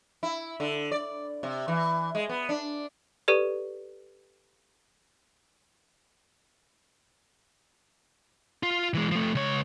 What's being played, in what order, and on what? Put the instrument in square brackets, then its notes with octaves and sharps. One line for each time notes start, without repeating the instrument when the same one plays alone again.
[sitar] E4
D3
D5
C3
E3
G#3
B3
D4
[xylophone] G4 A4 B4 D5
[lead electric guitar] F4
E3 G#3
F3 A3
C#2 C#5